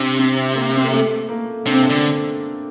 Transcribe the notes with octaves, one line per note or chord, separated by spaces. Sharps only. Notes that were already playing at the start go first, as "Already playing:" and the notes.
Already playing: C3 D4
C4
A#3
C4
A#3
A3
A#3
C3 D4
C4
D4
D3